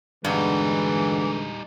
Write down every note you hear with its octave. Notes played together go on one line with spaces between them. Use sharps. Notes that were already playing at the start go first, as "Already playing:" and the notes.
G2 B2 D3 E3 G3 G#3 D#4